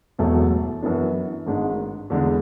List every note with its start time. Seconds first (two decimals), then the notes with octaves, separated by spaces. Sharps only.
0.19 E1 E2 B2 F#3 A3
0.82 F#2 E3 B3 D4
1.47 G#1 G#2 G#3 D4
2.10 E2 D3 G#3 D4